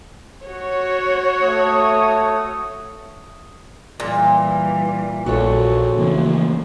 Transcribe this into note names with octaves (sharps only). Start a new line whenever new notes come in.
F#4 C#5
A3 D#6
A#2 E3 G3
A#1 F#4 A4 C#5
C#3 E3 F3 A3 A#3